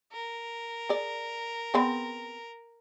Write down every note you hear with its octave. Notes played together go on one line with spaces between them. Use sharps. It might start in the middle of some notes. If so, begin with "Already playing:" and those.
A#4
G#4 D5
B3 C4 G#4